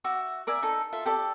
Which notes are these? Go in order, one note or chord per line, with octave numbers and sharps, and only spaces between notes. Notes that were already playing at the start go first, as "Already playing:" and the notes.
F#4 E5 D6
A#4 D5 E5 G#5
D#4 A4
F4 A4 E5
G4 A4 D5